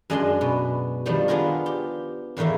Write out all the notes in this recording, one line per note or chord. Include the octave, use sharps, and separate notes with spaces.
F#2 G#3 D4 D5 G#5 C6
B2
D#3 F3 G3 D4
B3 D4 F4 G#4 A#4
G4
E2 A2 D#3 A#3 E5